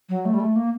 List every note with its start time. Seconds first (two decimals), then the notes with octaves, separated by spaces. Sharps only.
0.09 F#3
0.25 A3
0.34 G3
0.40 A3
0.56 A#3